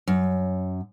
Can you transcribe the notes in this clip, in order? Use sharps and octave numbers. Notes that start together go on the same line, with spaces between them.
F#2